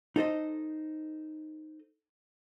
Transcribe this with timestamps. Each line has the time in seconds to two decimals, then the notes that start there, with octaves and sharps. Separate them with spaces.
0.16 D#4 A4 C5 D#5